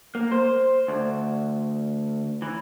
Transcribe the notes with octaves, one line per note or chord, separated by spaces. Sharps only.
A#3
C5
D2
E3